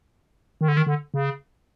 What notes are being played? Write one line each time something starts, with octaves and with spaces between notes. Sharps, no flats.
D#3
D3
D#3
D3
C#3